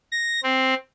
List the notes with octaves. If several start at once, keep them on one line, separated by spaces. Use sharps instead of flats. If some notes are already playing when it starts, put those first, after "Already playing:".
A#6
C4